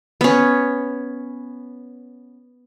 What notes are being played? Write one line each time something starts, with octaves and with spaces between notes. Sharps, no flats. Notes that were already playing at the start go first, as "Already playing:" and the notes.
B3 C#4